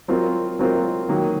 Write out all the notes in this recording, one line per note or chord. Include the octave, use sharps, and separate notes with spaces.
F#3 C4 F4 A#4
F#3 C4 F4 A#4
D#3 F#3 A#3